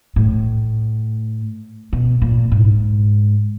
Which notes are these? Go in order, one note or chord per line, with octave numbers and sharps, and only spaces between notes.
A2
B2
A#2
G#2